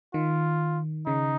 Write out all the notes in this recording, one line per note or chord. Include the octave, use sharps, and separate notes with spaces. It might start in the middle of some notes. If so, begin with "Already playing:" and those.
D#3 F4
C#3 D#4